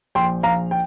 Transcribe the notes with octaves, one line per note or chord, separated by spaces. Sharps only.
A#1 G5 C6
A#1 F5 A#5
G5